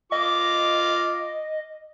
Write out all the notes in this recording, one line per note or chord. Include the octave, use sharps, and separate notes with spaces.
F4 D#5 D6